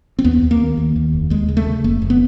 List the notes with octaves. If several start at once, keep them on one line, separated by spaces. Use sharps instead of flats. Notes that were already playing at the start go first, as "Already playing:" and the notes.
C4
D#2 B3
D#2
A#3
D#2
D#2
D#2
F1
D#2 G#3
C#3
A3
C#3
F1 A#3
F1
B3